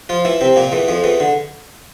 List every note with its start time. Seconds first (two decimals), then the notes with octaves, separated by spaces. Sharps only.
0.09 F3 F4
0.25 E3 E4
0.41 C3 C4
0.56 A#2 A#3
0.72 E2 E3
0.88 F2 F3
1.04 E2 E3
1.20 D3